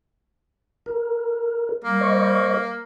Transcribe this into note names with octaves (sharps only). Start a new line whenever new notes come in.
A#4
G3 A#3
C5 D#5 C#6